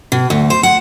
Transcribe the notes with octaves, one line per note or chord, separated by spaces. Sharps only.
B2
D2
C5
F#5